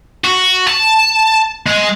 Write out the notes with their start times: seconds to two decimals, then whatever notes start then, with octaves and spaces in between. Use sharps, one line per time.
0.24 F#4
0.68 A5
1.66 G#3